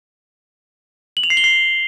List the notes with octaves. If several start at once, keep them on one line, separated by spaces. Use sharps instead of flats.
F#7
F7
C7
G7
C7